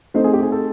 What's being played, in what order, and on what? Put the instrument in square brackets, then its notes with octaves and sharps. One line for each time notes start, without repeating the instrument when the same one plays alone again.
[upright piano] A3 C4 D#4 [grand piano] C5
[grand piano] G#4
G4
G#4
A4